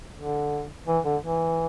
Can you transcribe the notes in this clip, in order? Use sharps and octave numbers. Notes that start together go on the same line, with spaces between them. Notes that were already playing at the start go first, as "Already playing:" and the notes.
D3
E3
D3
E3